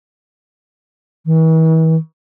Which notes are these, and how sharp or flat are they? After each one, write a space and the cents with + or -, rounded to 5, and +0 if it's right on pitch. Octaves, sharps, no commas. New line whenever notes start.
E3 -40